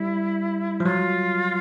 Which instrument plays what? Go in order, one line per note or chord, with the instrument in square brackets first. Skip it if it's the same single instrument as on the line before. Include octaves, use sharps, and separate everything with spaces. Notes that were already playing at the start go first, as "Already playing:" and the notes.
Already playing: [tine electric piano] G3 [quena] E4
[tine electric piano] F3
[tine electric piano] F#3 [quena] F4